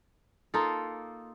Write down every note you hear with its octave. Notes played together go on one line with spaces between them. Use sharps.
A#3 D#4 F4 A4